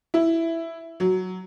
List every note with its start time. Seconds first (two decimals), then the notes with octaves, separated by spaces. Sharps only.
0.14 E4
1.00 F#3